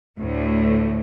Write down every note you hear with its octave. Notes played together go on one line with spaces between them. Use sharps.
D2 A2